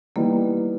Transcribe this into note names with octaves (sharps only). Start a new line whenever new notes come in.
E3 G3 A#3 B3 D#4